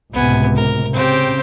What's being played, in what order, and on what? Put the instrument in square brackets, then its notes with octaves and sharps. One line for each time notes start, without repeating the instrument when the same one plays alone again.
[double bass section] C#2 A2 C3 [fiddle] B3 G#5
[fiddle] A#4
[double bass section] C#3 [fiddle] C4 G4